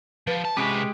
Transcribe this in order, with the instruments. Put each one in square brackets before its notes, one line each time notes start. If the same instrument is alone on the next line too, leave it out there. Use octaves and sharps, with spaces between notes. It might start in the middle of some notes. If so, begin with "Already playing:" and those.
[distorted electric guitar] F3 [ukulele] G4 B4
[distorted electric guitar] A5
[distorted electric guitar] C3 B4 [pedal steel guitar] G#3 G4 [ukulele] C#4 F#4 G#5